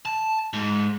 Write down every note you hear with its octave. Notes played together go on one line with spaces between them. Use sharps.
A5
G#2